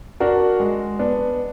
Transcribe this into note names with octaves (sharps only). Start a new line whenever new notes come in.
D4 F#4 A#4
G#3
B3 D4